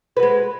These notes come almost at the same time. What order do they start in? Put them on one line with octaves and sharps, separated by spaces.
B4 F#4 G#3